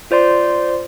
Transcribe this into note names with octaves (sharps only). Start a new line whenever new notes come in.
F4 C5 D5 C6